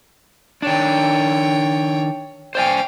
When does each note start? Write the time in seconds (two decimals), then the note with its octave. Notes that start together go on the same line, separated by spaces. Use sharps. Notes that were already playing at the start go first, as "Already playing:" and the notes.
0.62 D#3 D4 C#5 G5
2.55 C5 D5 F5 G5 G#5